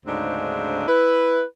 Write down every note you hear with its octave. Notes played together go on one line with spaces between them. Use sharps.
D2 G#2 C#3 C4 D4 D#4
E4 B4